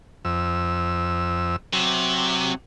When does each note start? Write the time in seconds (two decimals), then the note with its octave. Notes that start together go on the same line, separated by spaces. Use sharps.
0.25 F2 E6
1.73 C3 F#3